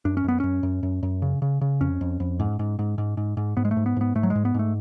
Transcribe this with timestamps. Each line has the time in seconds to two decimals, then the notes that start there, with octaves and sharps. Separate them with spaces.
0.05 F#2 D4
0.17 C#4
0.24 F#2 B3
0.40 F#2 C#4
0.63 F#2
0.83 F#2
1.03 F#2
1.22 C#3
1.42 C#3
1.61 C#3
1.81 F2 C#4
2.01 F2
2.20 F2
2.40 G#2
2.59 G#2
2.79 G#2
2.98 G#2
3.17 G#2
3.37 G#2
3.57 G#2 B3
3.65 G#3
3.71 A3
3.77 G#2
3.86 B3
3.97 G#2 B3
4.15 G#2 A3
4.23 F#3
4.30 G#3
4.35 G#2
4.45 B3
4.54 G#2 A3